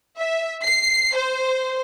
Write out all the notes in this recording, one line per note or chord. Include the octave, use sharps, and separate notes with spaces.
E5
C7
C5